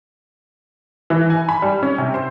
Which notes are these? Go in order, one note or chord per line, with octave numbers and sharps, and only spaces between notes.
E3
G#5
B5
G3
C#4
C3
C5